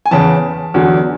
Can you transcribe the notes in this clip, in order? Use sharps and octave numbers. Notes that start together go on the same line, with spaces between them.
G#5
E2 C#3 E3 A5
E2 D3 F#3